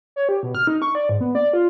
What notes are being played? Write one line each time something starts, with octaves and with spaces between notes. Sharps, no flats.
C#5
G4
B2
F6
D#4
C#6
D5
G#2
B3
D5
F4